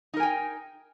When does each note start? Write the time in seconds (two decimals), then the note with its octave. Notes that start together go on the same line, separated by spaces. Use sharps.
0.14 D#4
0.17 A#4
0.20 G#5
0.23 G5